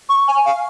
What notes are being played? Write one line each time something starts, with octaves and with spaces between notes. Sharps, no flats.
C#6
G#5
F5